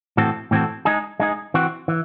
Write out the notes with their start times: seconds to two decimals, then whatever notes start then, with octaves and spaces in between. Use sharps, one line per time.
0.17 A2 E3 C4 F#4 A4
0.51 A2 E3 C4 F#4 A4
0.85 G#3 D#4 G#4
1.20 G#3 D#4 G#4
1.54 E3 C4 F#4
1.88 E3